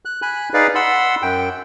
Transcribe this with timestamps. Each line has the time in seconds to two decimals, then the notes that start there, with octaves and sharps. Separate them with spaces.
0.05 F#6
0.22 G#5 B5 F#6
0.54 D#4 G#4 B4 D5 F5
0.75 F#5 B5 C6 E6
1.22 F#2 G5